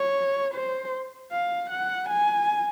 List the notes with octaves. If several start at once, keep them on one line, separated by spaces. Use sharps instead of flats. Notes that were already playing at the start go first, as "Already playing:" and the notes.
Already playing: C#5
C5
F5
F#5
G#5